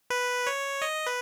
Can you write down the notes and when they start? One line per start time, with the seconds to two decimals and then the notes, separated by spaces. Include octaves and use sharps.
0.10 B4
0.47 C#5
0.82 D#5
1.07 B4